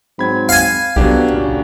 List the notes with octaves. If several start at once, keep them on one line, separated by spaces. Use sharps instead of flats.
G#2 F#3 C4 B5 G#6
F5 G#5
C2 F2 F#3 B3 D4 G4
A#2 C#3